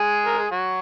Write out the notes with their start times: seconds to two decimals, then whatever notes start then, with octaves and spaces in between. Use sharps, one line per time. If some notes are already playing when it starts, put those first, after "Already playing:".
Already playing: G#3 G#4
0.26 A#4
0.38 G#4
0.51 F#3 F#4